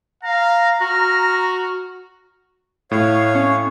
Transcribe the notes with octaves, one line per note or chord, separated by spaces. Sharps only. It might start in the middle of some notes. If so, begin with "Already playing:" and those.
F5 A#5
F#4 F6
A2 C#5 F5
C#4